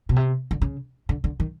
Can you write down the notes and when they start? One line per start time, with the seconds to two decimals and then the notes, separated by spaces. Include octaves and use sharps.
0.09 B2
0.16 C3
0.51 D3
0.62 C#3
1.09 D3
1.24 D3
1.40 D#3